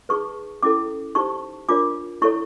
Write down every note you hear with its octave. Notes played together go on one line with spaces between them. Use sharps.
D#4 G#4 B4 C#6
C#4 E4 A4 D6
D#4 G4 C5 C#6
D4 F4 A#4 C#5 D6
E4 A4 C#5 C#6